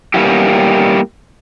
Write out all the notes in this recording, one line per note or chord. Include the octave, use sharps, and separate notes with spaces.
G3 A#3 B3 C#4 E4 G4